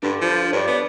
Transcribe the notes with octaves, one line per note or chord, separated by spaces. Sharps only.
G2 D4 A4
F3
G2 C#5 D5
B3